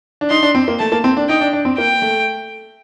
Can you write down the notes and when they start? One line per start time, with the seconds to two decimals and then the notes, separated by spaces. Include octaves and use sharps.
0.21 D4
0.30 D#4 C6
0.43 D4
0.55 C4
0.68 A#3
0.79 A3 A5
0.92 A#3
1.04 C4
1.17 D4
1.29 D#4 G5
1.41 D4
1.53 D4
1.65 C4
1.77 A#3 G5
2.02 A3